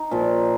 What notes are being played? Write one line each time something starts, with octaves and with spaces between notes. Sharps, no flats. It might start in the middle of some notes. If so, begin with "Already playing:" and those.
Already playing: D#4
A#2 F3